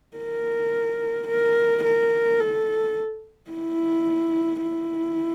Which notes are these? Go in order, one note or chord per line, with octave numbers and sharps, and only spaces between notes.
A#4
A#4
A#4
A4
E4
E4